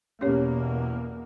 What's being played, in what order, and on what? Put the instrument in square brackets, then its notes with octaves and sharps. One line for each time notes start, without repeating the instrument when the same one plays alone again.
[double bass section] E2 B2 A#3 [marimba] C#4 G4 C#5